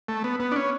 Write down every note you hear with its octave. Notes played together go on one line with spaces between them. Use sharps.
A3
B3
B3
D4
C#4